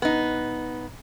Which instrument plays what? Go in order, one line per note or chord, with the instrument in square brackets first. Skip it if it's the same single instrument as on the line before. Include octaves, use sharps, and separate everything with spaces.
[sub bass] D#1 [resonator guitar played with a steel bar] B3 D#4